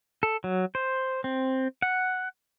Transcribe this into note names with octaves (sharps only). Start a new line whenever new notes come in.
A4
F#3
C5
C4
F#5